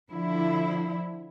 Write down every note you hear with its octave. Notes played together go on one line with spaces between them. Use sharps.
D3 F3 E4